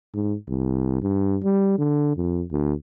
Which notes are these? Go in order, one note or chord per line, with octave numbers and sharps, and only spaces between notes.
G#2
C2
G2
G3
D3
F2
D2